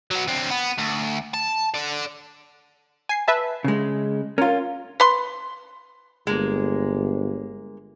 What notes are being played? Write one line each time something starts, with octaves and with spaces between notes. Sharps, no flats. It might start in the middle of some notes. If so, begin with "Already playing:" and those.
F#3 B3
D3 C4
B3
D2
A5
A4 D5
G#5 C7
B4 E5 A5
C#3 G#3
C#4 F4 A#4
B4 C6
G1 G#3 A#3